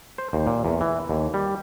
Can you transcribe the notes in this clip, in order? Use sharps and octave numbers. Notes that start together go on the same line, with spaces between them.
C5
D#2
A#2
E2
E3
D#2
G3